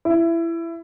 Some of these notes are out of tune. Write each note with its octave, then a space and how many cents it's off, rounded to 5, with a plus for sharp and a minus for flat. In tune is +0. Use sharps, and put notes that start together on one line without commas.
E4 +20